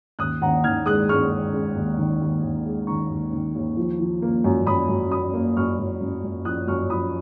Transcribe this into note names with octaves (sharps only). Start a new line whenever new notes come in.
D#2 D#6 F#6
D#2 F#5 A#5
D#3 F6 G#6
G#3 D#6 F#6
G#3 C#6 F6
G#3
G#3
D#2
D#3
D#2
D#2
G#3
D#3 A#5 C#6
D#2
D#3
D#2
F3
F3
A#3
F#2
F#2 B5 D#6
F#2
F#2 B5 D#6
A#3
F#2 C#6 F6
F#2
F#2
F#2
F3 D#6 F#6
F#2 C#6 F6
F3 B5 D#6